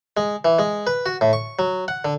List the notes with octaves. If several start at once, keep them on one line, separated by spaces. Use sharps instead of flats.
G#3
E3
G#3
B4
F#4
A2
C#6
F#3
F#5
D3